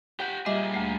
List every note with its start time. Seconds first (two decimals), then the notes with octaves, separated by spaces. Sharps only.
0.20 G4 F#5 G5
0.46 A#2 G3 G#4 D#5 E5
0.74 D2 A3